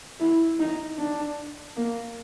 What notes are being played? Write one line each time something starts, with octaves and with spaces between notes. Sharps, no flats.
E4
D#4
D4
A#3